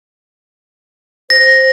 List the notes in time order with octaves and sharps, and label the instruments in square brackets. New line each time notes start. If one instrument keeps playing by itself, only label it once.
[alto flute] C5 [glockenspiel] A#6